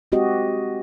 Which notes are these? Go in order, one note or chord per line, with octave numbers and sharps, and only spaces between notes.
G#3 C4 F#4 G4 D#5